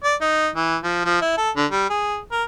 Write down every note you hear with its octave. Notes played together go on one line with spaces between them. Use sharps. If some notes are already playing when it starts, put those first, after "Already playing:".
D5
D#4
E3
F3
F3
E4
A4
D3
G3
G#4
A#4